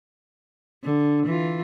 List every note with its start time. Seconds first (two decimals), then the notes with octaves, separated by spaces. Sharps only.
0.84 D3
1.26 E3 F4